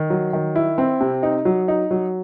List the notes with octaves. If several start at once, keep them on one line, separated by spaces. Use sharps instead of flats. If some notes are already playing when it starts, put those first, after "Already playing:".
Already playing: D#3
F#3
D#3
E4
C4
C3
D#4
F#3
D#4
F#3